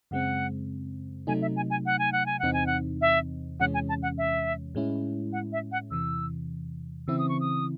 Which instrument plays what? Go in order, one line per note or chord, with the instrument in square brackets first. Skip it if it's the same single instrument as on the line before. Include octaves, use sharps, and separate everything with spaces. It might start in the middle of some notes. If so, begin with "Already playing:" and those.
[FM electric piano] F#2 C#3 G#3 C4 [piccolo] F#5
[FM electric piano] C3 F#3 A3 D#4 [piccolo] G#5
[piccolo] E5
G#5
G#5
F#5
G#5
F#5
G#5
[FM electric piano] E2 C3 E3 C4 D#4 [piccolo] F#5
[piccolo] G#5
F#5
E5
[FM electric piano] E2 C3 E3 G#3 C#4 [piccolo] F#5
[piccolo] G#5
A5
F#5
E5
[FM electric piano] A2 G#3 C#4 E4
[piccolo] F#5
E5
F#5
[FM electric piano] E2 C3 E3 [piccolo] E6
[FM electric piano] C#3 E3 C4 E4 [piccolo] E6
[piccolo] D#6
C#6
D#6